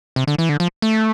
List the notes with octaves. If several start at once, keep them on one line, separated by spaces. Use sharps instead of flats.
C3
D3
E3
D3
F3
A3